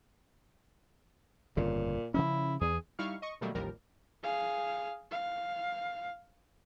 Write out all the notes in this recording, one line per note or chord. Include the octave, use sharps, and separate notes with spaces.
G1 F2 A#2 C#3
C#3 F3 C#4 E4
E2 G#4
G3 D#4 E4 F5 C#6 F6
D#5 C#6
B2 D#3 F#3 G3 A3 A#3
A1 D#2 F3 G3 A#4
G#4 F5
F5